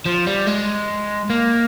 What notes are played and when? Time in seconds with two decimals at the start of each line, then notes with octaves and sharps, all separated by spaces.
0.06 F3
0.26 G3
0.47 G#3
1.30 A#3